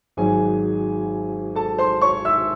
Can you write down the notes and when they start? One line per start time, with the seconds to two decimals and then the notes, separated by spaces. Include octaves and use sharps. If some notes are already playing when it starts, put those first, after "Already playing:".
0.17 G#1 G#2 F#3 G#4 G#5
1.55 A4 A5
1.78 C5 C6
2.01 C#5 C#6
2.25 E5 E6